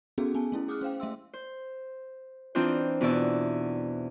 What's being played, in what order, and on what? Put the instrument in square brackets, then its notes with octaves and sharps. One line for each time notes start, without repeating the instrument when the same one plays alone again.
[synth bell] B3 C#4 D#4 F#4 G#4 A4
B3 G#5 A5
A3 C#4 E4
G#4 D6 D#6 F6 F#6
C#4 C5 F5 G5
A3 E5 C6 E6
[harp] C5
E3 C4 D4 D#4 F4 C5
E2 B2 E3 D5 E6